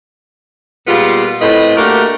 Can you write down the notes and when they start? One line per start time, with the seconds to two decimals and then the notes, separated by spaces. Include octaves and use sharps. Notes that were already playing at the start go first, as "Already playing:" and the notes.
0.87 A#2 G3 G#3 B3 F4
1.41 A2 C4 B4 D#5
1.77 A3 A#3 D4 F#4 G4 A#4